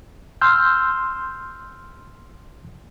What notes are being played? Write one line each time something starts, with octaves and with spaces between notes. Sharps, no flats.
C6 E6 F6 G6